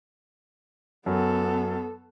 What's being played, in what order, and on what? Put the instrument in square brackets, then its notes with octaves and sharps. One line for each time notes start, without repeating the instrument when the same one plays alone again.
[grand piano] F#2 [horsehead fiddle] B3 A4